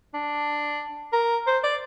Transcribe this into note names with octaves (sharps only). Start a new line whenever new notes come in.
D4
A#4
C5
D5